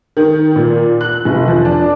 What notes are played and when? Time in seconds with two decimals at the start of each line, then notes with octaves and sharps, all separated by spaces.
0.17 D#3
0.56 A#2
1.01 F#6
1.25 F1
1.48 F3
1.65 D4